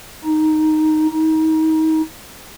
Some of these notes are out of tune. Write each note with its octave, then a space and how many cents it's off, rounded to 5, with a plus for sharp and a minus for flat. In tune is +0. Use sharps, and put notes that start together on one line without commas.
D#4 +0
D#4 +30